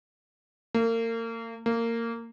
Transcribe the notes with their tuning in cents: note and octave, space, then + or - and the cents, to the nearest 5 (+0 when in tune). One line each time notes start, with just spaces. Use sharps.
A#3 -35
A#3 -20